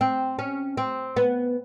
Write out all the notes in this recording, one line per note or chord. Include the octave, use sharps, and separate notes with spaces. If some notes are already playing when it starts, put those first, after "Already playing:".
C4
C#4
C4
B3